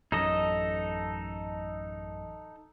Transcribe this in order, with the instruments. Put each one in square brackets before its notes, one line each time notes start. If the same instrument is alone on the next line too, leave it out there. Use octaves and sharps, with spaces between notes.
[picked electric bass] A1 F#2 [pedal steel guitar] D#4 A4 D#5